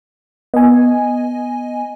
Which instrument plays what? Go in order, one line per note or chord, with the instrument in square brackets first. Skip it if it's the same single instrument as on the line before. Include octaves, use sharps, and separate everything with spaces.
[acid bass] B3 [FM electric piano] D#5 G#5